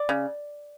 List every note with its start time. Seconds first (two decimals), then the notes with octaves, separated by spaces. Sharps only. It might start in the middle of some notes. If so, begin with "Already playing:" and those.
Already playing: D5
0.09 C#3